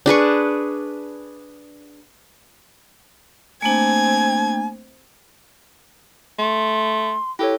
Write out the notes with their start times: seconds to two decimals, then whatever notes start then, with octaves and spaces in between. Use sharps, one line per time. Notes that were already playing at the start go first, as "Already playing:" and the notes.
0.06 D4 G#4 B4 C#6
3.62 A3 A#3 C4 D4 G#5 G#6
6.39 A3 C6
7.39 E4 G4 A4 C#5